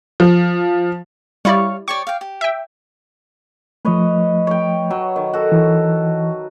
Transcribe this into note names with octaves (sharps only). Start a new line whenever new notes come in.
F3
G3 E4 C#5 D5 F5 C#6
G4 C#5 D5 C#6
F5 G5
G4
E5 G5
F3 A3 B4 C#5 D#5
C#5 G5
F#3
D#3
F#4 A4
E3